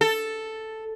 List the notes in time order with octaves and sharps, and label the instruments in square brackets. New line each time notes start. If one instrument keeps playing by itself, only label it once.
[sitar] A4